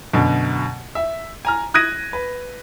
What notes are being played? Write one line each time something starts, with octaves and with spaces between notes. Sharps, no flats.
F#2 B2 D3
E5
G#5 A#5 F6
D#6 F#6 G#6 A#6 D#7
B4